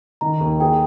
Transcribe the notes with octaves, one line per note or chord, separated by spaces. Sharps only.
D#3 A#5
D#2
G#4 G5